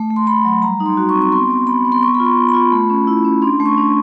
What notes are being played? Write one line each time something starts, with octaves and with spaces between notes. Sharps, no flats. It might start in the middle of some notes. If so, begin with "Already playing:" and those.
Already playing: A3
A3
C6
A3 B5
F#3
G3 A#5
D#4
C6
F#4
C#6
C4
C#6
B3 C6
B3
B3 B5
B3
C6
B3 C#6
B5
F4
C6
B3
B5
F4
A3
C#4
E4
C#4
D4 C6
A3
C#6
D4